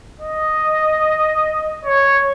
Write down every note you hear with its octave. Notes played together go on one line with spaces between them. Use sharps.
D#5
C#5